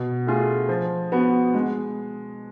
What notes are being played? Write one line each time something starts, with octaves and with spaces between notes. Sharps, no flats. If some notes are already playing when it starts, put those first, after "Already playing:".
Already playing: B2
A3 F4 G#4
F3
B3 F#4
G#3